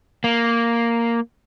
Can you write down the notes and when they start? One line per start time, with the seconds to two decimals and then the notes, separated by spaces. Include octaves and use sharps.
0.24 A#3